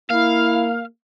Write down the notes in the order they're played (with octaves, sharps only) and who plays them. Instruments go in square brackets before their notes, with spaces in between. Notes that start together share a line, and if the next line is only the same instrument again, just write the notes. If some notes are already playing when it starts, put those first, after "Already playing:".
[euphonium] A#3 [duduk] E4 [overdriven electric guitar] F5